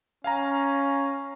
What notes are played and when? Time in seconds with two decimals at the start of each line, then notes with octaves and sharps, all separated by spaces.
0.24 C#4 F5 G#5 A#5